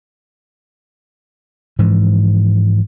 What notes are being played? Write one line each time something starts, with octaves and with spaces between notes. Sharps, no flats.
G#2 E3 F3